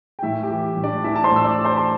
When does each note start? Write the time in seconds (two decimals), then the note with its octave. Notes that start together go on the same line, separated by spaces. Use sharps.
0.19 G5
0.23 A2 E4 E5
0.43 G4 G5
0.50 E3
0.77 A2
0.84 D4 D5
1.03 E3 E4 E5
1.16 A5
1.24 C5 C6
1.31 A2 E6
1.44 D5 D6
1.57 E3
1.65 C5 C6
1.77 C6